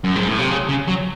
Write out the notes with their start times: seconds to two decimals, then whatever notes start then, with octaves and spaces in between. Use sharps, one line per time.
0.04 F#2
0.16 G#2
0.27 A2
0.38 C3
0.51 C#3
0.69 C#3
0.88 F#3